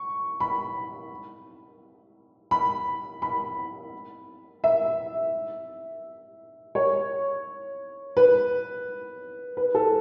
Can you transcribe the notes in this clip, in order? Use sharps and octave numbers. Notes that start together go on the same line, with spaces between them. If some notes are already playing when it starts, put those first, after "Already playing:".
Already playing: C#6
B5
B5
B5
E5
C#5
B4
B4
A4